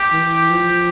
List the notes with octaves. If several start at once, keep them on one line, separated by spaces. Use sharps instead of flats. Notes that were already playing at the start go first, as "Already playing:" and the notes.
Already playing: G4
E3
F3